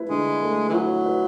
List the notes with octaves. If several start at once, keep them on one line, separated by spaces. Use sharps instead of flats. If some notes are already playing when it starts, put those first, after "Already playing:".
Already playing: A3 E4 B4
D3 G#3
A3
E3
F#3 E4
B4